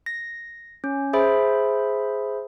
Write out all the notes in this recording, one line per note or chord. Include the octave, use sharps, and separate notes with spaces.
A#6
C#4
G#4 C5 E5 B5